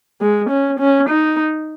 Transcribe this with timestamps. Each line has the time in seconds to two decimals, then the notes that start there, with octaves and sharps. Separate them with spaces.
0.21 G#3
0.50 C#4
0.79 C#4
1.09 D#4